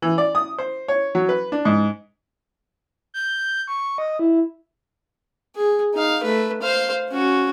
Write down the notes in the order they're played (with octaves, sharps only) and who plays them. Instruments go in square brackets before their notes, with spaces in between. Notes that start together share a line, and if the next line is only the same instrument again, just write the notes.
[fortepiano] E3
D5
D#6
C5
C#5
F#3
B4
D4
G#2
[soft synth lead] G6
C#6
D#5
E4
[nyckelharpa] G#4
D#4 F5
A3 B4
C5 F5
C#4 F#4